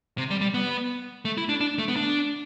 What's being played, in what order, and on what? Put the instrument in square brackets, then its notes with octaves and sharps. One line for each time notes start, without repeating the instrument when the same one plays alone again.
[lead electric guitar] C3
G3
G3
B3
A3
E4
D4
D4
A3
B3
D4